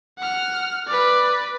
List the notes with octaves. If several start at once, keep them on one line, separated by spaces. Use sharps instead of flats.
F#5 F6
B4 D5